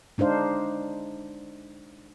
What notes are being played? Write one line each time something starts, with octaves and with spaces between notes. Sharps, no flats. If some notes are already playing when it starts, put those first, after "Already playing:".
G#3 D4 D#4 C5 F5